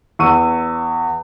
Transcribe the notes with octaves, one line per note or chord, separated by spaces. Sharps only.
E2 C#6 E6 D#7